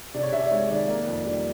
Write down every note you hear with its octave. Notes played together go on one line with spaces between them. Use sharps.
C3 D5
C#5
C3 E5
D5
G#3 C#5
D#3 D5
A#3
F2
G3